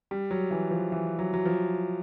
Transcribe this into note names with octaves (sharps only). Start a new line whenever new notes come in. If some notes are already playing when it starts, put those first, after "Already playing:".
G3
F#3
E3
F3
E3
F#3
F#3
F3